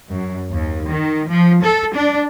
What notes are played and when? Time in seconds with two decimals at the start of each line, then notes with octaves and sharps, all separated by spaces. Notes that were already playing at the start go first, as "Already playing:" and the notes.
0.11 F#2
0.52 D#2
0.86 D#3
1.28 F3
1.62 A4
1.95 D4